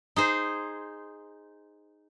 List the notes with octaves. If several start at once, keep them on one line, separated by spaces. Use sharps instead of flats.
D#4 G#4 C5